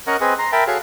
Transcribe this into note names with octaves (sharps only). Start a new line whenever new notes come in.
C#4 A#4 C#5 D#5 F#5
C4 G#4 B4 D#5
A#5 C6
A#4 E5 G5 A5 B5
F#4 G#4 A4 C#5 F5